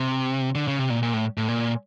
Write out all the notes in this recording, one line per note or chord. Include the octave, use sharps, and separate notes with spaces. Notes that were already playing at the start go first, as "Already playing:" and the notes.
Already playing: C3
D3
C#3
C3
A#2
A#2
A2
A2
A#2